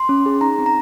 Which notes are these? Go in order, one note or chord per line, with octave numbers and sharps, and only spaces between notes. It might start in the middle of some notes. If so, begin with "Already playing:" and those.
Already playing: C6
C#4
G#4
D#4 A#5
C4
A#5